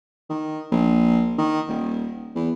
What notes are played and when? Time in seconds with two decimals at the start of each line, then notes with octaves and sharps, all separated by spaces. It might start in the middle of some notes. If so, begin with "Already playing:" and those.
0.30 D#3
0.71 A#1
1.38 D#3
1.68 D#1
2.35 E2